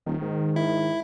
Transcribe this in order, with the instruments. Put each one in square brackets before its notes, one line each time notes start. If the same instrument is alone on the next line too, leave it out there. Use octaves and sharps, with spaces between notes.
[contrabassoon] D#1 [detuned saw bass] D#3
[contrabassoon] G#2
[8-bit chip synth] E4